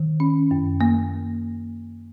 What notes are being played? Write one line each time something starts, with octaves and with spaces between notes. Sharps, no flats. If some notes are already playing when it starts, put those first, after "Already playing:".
Already playing: D#3
C#4
F#2
A#3